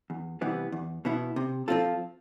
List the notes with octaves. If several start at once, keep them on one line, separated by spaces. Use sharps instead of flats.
E2
C3 E3 G3 B3
E2
B2 B3 E4
C3
F3 C4 F4 A4